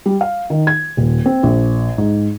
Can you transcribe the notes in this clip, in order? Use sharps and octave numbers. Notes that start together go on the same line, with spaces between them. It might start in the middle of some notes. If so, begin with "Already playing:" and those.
G3
F5
D#3
G#6
D#1
C4
A#1
G#2